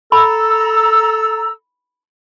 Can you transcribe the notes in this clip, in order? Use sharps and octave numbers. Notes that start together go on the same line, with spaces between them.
A4 A#5 B5 E6